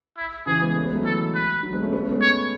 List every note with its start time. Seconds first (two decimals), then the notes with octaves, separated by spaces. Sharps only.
0.17 E4
0.46 C#3 E3 G#4
0.61 G#3 B3
0.76 A3 C#4
0.85 G#3 B3
0.95 F#3 A3
1.04 E3 G#3 A4
1.35 B4
1.63 D3 F#3
1.73 G#3 B3
1.82 A3 C#4
1.92 G#3 B3
2.03 A3 C#4
2.12 G#3 B3
2.21 C#5